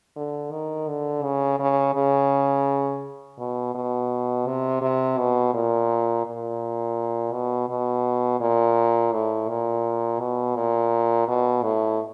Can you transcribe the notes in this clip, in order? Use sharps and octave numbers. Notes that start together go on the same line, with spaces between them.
D3
D#3
D3
C#3
C#3
C#3
B2
B2
C3
C3
B2
A#2
A#2
B2
B2
A#2
A2
A#2
B2
A#2
B2
A2